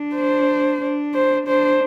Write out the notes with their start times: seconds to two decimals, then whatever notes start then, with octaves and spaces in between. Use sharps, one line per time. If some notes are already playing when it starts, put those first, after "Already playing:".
Already playing: D4
0.15 C5
0.81 D4
1.14 C5
1.47 D4 C5